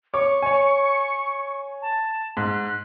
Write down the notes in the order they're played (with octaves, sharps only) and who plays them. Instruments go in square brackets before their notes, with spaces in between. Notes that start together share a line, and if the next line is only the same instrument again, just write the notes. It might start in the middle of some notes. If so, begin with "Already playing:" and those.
[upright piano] C#5 D6 [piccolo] C#6
[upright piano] C#5 G#5
[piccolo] A5
[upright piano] G#2 [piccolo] F#6